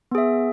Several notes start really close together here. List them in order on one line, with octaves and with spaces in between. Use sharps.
B3 G#4 E5